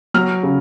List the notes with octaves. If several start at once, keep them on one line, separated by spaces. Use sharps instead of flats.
F#3 F6
C#3